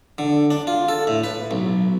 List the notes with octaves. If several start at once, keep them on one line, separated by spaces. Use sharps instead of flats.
D3
D4
F4
A4
A2
B4
B1